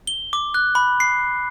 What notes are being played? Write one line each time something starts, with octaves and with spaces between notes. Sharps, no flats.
G7
D6
F#6
B5
C7